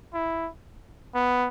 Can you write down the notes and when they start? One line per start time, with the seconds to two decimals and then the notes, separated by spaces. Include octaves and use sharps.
0.14 E4
1.15 B3